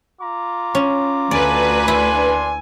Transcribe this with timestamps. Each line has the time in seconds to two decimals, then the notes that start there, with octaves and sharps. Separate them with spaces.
0.21 F4 A#5 D6
0.75 C#4
1.31 D2 B4 D5 G#5
1.88 A#3 D4 E4 C6